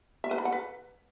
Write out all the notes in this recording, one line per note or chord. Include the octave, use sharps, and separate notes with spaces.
E5
B4
B5
F#5
B4